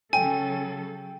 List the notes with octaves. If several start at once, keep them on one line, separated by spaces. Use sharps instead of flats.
C#3 F#3 A4 G5 G#5